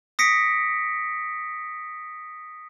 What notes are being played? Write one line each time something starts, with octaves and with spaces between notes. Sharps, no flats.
D#6 A#6 B6 C#7 D7